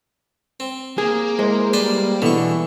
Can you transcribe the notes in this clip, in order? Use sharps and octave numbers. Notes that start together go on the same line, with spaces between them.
C4
A#3 G#4
G#3 E4 A#4 C5
G3 B4 C5 D5
B2 D3 E3 C#6